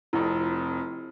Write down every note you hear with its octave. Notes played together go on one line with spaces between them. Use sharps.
F1 F2 E4